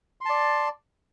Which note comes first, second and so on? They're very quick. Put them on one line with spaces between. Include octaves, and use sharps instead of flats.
C6 A5 D5